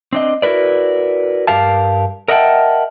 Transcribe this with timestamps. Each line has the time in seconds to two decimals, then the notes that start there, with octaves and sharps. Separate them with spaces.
0.13 C4 D4 D#5
0.42 E4 F#4 A#4 B4 D5
1.47 G2 G4 A#4 F5 A5
2.28 A#4 D#5 E5 F#5 G5 A5